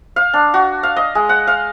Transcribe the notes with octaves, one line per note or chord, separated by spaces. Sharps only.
F5
D4
F#4
F5
D#5
G#3
F#5
F5